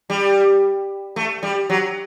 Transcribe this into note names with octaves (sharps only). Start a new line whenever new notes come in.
G3
A3
G3
F#3